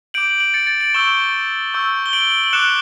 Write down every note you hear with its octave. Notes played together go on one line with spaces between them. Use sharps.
D6 G6 D7 F#7
D7 F#7
D7 F#7
A6 C#7
A6
D7 F#7
C#6 E6 G6 E7 G7
C#6 E6 G6
G7
D7 F#7
F#7
D6 F#6 C#7 E7